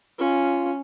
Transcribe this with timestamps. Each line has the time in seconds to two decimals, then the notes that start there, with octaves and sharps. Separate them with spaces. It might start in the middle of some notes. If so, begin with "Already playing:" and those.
0.19 C#4 F4